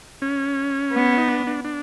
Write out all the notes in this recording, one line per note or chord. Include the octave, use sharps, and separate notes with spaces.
C#4
B3
D#4
D4
D4
D4